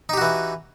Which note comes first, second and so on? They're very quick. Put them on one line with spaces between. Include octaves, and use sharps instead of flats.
D#4 G4 F#4 E3